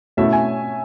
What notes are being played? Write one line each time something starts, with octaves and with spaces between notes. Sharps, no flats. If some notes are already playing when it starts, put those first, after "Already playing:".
B2 A3 C#4 E4 E5
G#5